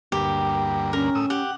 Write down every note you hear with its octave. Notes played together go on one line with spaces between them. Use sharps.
D2 G2 A#3 G4
C#4 A#4
A2 D#6 E6
G4 F#5